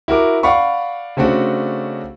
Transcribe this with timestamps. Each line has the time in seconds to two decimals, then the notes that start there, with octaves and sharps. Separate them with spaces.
0.08 E4 F#4 A#4 D6
0.43 D5 F5 F#5 B5 C#6
1.17 C#3 A3 C4 D4 F#4